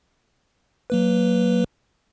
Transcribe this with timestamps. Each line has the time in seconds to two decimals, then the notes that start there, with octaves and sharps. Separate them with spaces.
0.90 F#3 A#3 B4